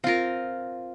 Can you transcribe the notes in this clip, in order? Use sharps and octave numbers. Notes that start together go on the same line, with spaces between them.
C4 F4 A#4 F5